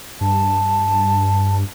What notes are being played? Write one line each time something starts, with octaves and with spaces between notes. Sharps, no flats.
G2 A5